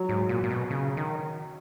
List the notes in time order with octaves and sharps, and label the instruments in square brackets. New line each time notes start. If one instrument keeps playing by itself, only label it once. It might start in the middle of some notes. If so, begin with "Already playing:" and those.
Already playing: [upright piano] F#3
[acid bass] G#2
A#2
A#2
B2
C#3
D#3